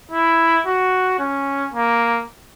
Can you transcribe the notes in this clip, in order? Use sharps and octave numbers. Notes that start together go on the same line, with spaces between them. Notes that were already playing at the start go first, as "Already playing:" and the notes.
E4
F#4
C#4
A#3